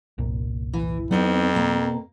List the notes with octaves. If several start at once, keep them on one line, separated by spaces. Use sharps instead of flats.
G1 C2 A#2
E3
F2 F#3 B3 C4 D#4
B2 A#3